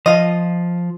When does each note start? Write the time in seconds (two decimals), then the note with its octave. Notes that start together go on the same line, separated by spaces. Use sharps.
0.06 F3 D#5 F5